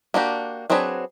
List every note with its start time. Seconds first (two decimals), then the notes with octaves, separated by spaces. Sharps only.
0.14 A#3 D4 F#4 G4
0.70 F#3 C4 D4 G#4 B4